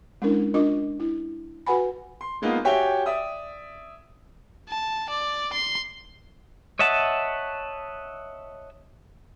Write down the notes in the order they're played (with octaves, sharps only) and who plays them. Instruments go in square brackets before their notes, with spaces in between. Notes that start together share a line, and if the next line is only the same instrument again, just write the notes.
[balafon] G#3 C#4 D4 E4 A#4
D4 F4 A#4 D#5 D6
E4
F#4 B4 F#5 G#5 B5
[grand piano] C6
G#3 A#3 B3 D#4 F4
F#4 G4 C#5 E5 G5 G#5
D5 E5 D#6
[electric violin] A5
D5
C6
[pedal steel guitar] C#5 D#5 E5 F#5 A5